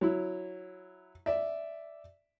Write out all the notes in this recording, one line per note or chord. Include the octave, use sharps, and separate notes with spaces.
F#3 E4
D5 E5